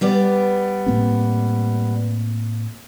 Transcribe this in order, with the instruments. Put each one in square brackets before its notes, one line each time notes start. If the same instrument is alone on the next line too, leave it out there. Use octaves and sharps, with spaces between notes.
[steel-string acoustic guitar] G3 B3 D5
[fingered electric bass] A2 A#3 C4